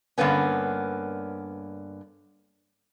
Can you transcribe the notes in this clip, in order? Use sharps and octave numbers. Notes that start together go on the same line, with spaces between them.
G2 D3 A#3 B3 C#4